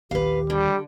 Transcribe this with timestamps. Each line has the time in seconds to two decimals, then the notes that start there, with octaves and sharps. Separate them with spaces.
0.11 A#1 D#2 G4 B4 F5
0.50 D3 G3